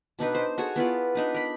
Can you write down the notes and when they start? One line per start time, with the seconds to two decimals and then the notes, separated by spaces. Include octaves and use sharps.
0.19 B2 D4 D#4 B4
0.35 C5
0.58 F#4 G#4 A4 C#5
0.76 B3 E4 F4 D5
1.15 D4 D#4 B4
1.34 A#4 B5